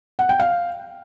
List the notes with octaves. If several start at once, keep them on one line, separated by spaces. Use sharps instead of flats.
F#5
G5
F5